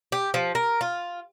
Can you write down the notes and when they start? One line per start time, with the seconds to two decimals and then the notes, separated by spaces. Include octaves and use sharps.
0.12 G4
0.34 F3
0.55 A#4
0.81 F4